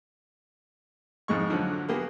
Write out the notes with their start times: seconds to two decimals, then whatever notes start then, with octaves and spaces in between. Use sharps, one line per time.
1.28 F2 G#2 G#3 C#6
1.50 D3 F3 F#3
1.89 A#3 B3 G4 G#4